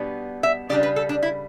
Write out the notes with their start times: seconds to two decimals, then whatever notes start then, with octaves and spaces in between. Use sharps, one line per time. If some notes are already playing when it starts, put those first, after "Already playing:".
Already playing: B2 G3 B3 D4
0.43 E5
0.69 C#3 G3 D4 D5
0.83 B4
0.96 A4
1.09 D4
1.22 E4